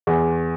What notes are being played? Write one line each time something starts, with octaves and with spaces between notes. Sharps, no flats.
E2